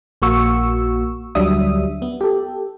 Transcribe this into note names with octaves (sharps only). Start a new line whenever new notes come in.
A#1 A#3 F#4 C#6 E6
D2 F#3 G3 D4 E5 D#6
B3
G4 A4